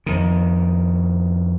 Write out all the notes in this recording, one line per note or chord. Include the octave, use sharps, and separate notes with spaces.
F2 D#3